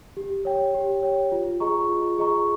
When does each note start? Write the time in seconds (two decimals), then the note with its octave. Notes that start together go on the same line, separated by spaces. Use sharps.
0.17 G4
0.45 C#5 G5
0.75 G4
1.03 C#5 G5
1.32 F4
1.60 G#4 D#5 A#5 C#6
1.89 F4
2.18 G#4 D#5 A#5 C#6